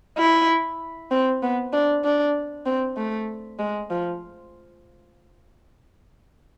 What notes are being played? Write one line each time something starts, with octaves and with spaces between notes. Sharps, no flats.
E4
C4
B3
D4
D4
C4
A3
G#3
F3